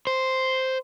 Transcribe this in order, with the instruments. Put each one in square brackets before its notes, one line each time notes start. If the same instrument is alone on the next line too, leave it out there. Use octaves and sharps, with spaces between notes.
[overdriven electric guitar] C5